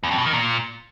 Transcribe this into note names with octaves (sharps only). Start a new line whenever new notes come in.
E2
F2
B2
D#3
A#2